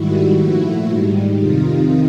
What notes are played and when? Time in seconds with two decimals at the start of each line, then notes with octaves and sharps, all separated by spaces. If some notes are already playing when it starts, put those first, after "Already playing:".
Already playing: G#2 D#3 G3 E4 F#4
0.40 A#2 F3 A3 E4 F#4
0.89 G#2 D#3 G3
1.38 F2 C3 D#3 D#4 F4